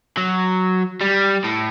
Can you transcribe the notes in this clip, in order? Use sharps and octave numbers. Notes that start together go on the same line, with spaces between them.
F#3
G3
A2